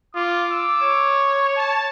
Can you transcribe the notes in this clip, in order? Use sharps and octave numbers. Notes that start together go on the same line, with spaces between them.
F4 D6
E6
C#5
A5